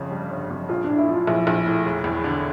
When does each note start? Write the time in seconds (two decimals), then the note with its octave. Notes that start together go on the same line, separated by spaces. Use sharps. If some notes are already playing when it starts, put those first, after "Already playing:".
Already playing: G1 F2 C#3
0.11 G3
0.31 G1
0.50 F2
0.69 A#1 F4
0.84 A2 D4
0.99 E4
1.09 F3 F4
1.27 A#1 E4
1.47 A#1
1.66 A2
1.85 E1
2.04 E2
2.24 D3